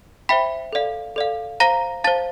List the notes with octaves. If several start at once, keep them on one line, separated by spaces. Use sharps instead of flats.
C5 E5 G5 B5 B6
A4 D5 F5
A4 D5 F5
C5 F5 A#5 A#6
C5 F5 A5 A6